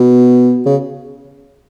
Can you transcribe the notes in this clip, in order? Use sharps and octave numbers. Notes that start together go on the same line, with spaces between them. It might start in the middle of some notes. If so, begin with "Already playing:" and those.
Already playing: B2
C#3